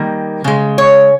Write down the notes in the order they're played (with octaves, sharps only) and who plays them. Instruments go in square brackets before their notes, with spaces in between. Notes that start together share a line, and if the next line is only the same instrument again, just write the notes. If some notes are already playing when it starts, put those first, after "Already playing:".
Already playing: [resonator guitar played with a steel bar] D#3 G3 A#3
C#3 G#3
C#5